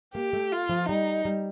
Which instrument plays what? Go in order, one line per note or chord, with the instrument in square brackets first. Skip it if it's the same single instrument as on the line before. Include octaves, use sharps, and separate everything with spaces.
[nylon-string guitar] A#3 [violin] G4
[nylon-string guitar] A3
[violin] F4
[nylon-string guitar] F3
[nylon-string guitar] G3 [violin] D#4
[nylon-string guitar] G3